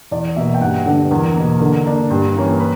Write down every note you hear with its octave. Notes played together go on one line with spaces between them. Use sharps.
E2 D5
B2 A#3 E5
G5
G2 F#5
D3 G3 B3 D4
E2 A#4
B2 A#3
D3 A#4
A#3 D4
G2
E3 A#3 C#4
B4